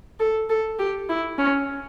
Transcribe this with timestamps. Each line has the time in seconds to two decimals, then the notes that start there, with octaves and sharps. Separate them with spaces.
0.20 A4
0.50 A4
0.79 G4
1.09 E4
1.39 C#4